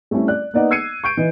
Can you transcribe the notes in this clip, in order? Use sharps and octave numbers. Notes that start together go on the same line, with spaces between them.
G3 A3 C4 C#4 E4
D5 F#6
A#3 B3 D#4 D5 D#5 F#5
E6 G#6 C7 C#7 D#7
C#6 G6 D7
E3 D#5